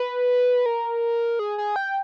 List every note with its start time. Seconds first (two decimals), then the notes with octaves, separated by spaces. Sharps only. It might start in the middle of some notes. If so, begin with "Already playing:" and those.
Already playing: B4
0.66 A#4
1.39 G#4
1.58 G#4
1.76 G5